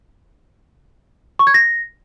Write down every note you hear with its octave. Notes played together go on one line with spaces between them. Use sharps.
C#6
G#6
A#6